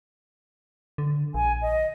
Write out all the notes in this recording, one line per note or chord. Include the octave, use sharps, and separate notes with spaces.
D3
A#1 G#5
D#5